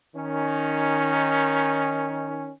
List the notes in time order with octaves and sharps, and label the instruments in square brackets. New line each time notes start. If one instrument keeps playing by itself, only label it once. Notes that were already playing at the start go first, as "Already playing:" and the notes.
[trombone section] D#3 C#4